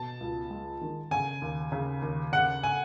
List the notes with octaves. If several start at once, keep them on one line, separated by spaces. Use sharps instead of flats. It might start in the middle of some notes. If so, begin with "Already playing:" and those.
Already playing: B2 A5
C#2
G#3
D#3
C#3 G#5
D#2
C#3
D#2
C#3 F#5
G#5